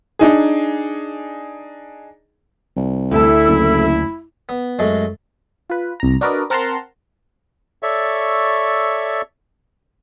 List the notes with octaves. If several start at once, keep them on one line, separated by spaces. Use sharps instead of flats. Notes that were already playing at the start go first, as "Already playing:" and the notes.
D4 D#4 G#4
C2
D2 E4 A4 A5
F#1
B3
F#2 G#3 A3
F4 B4
C2 A#5
D4 F#4 A#4 B4 D5 D#5
C4 A#4 F#5 A5 A#5 C6
A4 C#5 D5 E5 C#6